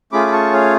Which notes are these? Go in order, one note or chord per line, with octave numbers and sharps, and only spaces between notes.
A3 C#4 F4 G#4 B5 D6
B5
A5 C#6
C#5 F5